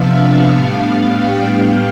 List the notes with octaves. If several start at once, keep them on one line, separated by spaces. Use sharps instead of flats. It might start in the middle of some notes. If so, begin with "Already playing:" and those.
Already playing: C3 F3 B3 D4 E5 F5
A2 G3 B3 D4 F5
G5